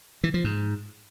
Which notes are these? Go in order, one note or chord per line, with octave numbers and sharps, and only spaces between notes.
E3
F3
G#2